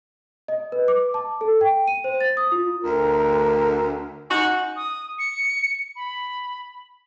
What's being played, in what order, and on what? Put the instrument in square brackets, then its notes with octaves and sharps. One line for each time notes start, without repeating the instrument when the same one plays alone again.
[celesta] D#5
B4
D6
A5
A4
G5
D#7
C5
A6
D#6
F4
[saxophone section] D2 [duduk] A#4
[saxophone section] C#4 D#4 F#4
[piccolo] D#6
C#7
B5